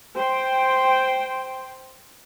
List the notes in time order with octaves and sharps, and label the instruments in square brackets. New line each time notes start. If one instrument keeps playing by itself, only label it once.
[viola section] C5 G5